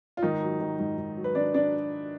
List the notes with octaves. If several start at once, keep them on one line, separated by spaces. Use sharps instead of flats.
F4
G#2 D#3 D#4
F#3
D#3
G#2
G#2
F#3
B4
D#3 D4 D5
D4 D5